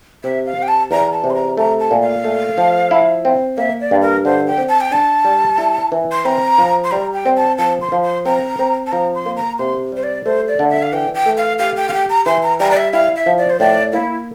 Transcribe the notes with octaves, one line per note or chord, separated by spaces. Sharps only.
C3 E5
F5
C3
G5
A5
E2 A#5
A5
C3
C6
A#5
A3 A#5
A5
A#2
F5
A3
F3
E4
C4
A#3 E5
D5
G2
A#4
D3 C5
G5
C4
A5
G5
D4 A5
G3
E4
E3
C6
C4 A#5
F3
C6
G3 A#5
G5
C4
A5
F3 A5
C6
F3
C6
C4 A#5
C4
A5
F3 A#5
C6
A#3
A#5
C3 C6
G3 C5
D5
A3 C5
D5
D3
E5
F5
E3 G5
G5
A3
F5
G4 F5
G5
F5
G4 G5
A#5
E3 C6
A#5
G3 A#5
D5
E5
E4 F5
E5
F3
D5
C5
A2 D5
A#3 E4